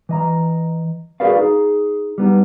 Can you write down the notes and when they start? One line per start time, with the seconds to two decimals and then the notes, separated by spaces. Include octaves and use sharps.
0.09 E3 D#5 A#5
1.20 F#4 G#4 A#4 B4 D5 F5
1.36 D#4 G#4
2.18 G3 B3 D#4